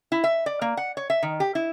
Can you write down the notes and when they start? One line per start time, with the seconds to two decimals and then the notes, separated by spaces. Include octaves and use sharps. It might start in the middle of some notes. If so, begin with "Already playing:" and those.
0.12 E4
0.24 E5
0.46 D5
0.62 A#3
0.77 F#5
0.97 C#5
1.10 E5
1.23 D#3
1.40 G4
1.55 E4